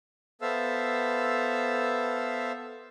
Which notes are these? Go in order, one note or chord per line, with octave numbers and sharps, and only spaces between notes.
B3 A4 C5 E5 F5 E6